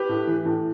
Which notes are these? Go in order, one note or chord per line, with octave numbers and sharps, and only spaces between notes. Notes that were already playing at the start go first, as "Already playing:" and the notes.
Already playing: G4 B4
A2
E3
A2